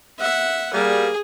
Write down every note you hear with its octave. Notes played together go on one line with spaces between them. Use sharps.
E5 F#5
G3 A#3 G#4